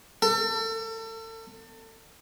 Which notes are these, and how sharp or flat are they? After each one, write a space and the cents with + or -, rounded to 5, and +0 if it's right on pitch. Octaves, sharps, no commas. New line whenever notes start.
A4 +35